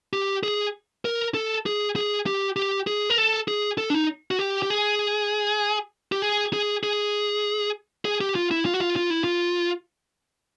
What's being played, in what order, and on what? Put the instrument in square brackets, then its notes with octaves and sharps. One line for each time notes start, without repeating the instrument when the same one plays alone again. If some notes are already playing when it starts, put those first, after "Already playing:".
[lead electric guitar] G4
G#4
A#4
A4
G#4
G#4
G4
G4
G#4
A#4
A4
G#4
A4
D4
D#4
F#4
G4
G4
G#4
G4
G#4
G#4
G#4
G#4
G4
F4
E4
F4
F#4
F4
F4
E4
F4